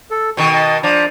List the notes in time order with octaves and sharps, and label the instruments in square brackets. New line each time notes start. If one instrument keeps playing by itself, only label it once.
[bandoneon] A4
[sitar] B2 D#3 [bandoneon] C#6
[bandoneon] D#5 A5
[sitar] F3 [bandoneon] D4 D5 A#5